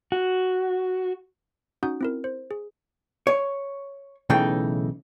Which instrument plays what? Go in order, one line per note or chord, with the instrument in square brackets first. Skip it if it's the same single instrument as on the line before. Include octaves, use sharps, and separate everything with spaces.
[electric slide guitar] F#4
[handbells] C#4 D#4 F#4 F#5 D#6 G6
C4 E4 A#4
C5
G#4
[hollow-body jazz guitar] C#5
B1 C#3 E3 A3 D#4 G5